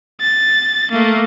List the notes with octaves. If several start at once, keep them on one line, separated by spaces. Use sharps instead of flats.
A6
A3 A#3